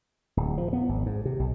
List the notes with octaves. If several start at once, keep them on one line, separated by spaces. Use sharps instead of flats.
D1
F3
B3
G#1
G#2
C3
B1